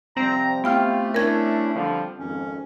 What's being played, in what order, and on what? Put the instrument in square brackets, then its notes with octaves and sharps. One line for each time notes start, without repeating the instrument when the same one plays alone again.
[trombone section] C3 F3 G3 [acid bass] C4 [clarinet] A#5
[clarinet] A3 [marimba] B3 G5 F6 [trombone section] E4 F4 G4
[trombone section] C#4 D4 E4 [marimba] A#4 G#6
[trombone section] D3 F3 G3
[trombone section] G#1 F2 [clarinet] C#4